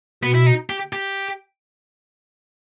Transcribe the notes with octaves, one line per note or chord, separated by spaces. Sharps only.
B2 B3
E4
D#4
G4
G4